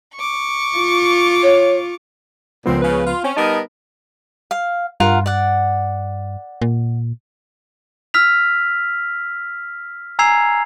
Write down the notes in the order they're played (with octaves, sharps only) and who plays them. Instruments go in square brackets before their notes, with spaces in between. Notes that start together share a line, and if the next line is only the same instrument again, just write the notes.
[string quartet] C#6 D6
[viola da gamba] F4
[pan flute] C#5
[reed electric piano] C#2 F3 B3 [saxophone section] A#2 C4
[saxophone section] C#3 [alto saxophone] B4
[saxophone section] F4
[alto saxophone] C4 [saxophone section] C#4
[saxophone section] G3 B3 A#4 [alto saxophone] D#4 [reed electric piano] A5 D#6
[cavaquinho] F5
[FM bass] G2 [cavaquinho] F4 A#4 F#5
[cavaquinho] D5 F#5
[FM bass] A#2
[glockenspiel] E6 F6 B6 F7
G#5 A#5 E6 G#6 C7 F7